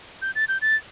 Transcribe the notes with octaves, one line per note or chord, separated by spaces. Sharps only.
G6
A6
G6
A6